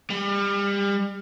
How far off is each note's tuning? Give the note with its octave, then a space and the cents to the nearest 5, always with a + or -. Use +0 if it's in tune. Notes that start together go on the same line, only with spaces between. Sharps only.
G3 +30